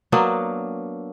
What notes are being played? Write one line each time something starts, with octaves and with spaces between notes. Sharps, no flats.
F#3 A#3 B3 D4